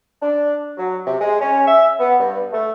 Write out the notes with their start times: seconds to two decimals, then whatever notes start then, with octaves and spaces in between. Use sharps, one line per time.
0.22 D4
0.78 F#3
1.07 C3
1.20 G#3
1.40 C#4
1.68 E5
1.99 B3
2.20 G2
2.52 A3